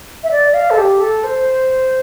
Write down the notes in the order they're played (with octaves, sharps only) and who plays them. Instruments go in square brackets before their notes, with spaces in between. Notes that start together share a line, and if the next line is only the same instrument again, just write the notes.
[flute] E5
D5
F5
A4
G4
A4
C5